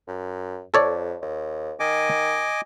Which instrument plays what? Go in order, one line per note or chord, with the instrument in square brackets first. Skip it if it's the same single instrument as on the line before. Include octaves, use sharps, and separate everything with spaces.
[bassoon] F#2
[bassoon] F2 [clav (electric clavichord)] A4 C#5 D5
[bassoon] D#2
[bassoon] D#3 [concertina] D#5 G#5 D6